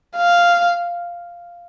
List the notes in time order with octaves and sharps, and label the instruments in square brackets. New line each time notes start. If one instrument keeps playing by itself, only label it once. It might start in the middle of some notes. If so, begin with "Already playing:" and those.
[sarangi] F5